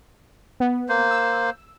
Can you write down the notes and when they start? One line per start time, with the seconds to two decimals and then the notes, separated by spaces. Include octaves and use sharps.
0.60 B3
0.89 A#3 C5
1.11 E6